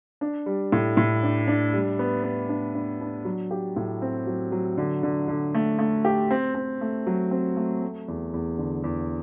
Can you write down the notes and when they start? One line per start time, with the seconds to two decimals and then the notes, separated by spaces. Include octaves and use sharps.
0.21 D4
0.46 G3
0.72 A2
0.97 A2
1.23 D4
1.47 D4
1.73 G3
1.99 B3
2.24 B3
2.49 D4
2.74 D4
3.01 D4
3.25 F#3
3.51 G4
3.76 A2
4.02 C4
4.27 F#3
4.52 F#3
4.78 D3
5.03 D3
5.28 D3
5.55 A3
5.79 A3
6.05 G4
6.31 C4
6.55 C4
6.81 A3
7.07 F#3
7.31 C4
7.56 A3
7.82 A3
8.08 E2
8.34 E2
8.59 D3
8.84 E2